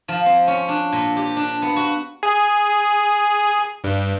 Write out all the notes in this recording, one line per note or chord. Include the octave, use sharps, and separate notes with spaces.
F3
C4
C#4
D4
A#2
G4
D4
B3
F#4
G#4
G2